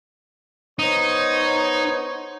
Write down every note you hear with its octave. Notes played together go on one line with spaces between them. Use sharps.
B3 D#4 C5 C#5